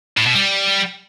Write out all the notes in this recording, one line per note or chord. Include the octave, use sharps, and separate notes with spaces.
A2
B2
G3